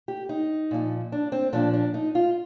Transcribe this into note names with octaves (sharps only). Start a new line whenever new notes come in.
G4
D#4
A#2 F3
D4
C4
A#2 F3 D4
D4
D#4
F4